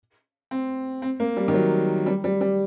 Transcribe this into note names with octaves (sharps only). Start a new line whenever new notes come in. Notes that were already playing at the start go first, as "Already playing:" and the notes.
C4
C4
A#3
G3
D#3
F#3
G3
G3
G3